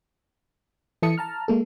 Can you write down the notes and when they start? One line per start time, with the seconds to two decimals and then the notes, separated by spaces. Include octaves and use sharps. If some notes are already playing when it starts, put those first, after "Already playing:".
1.02 E3 E4 A4 A5 D#6 C#7
1.18 A5 A#5 F6
1.48 G#3 A#3 A4